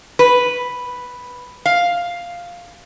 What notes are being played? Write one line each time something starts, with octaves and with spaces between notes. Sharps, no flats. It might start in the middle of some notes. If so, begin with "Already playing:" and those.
B4
F5